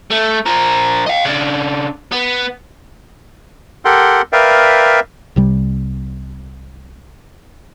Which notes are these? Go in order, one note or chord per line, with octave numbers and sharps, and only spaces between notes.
A3
F3 A#4
D#5 F5
C#3 D4
B3
G4 A4 A#4 F#5 G5 C6
A#4 B4 D5 E5 F5 G5
C2 C3 G3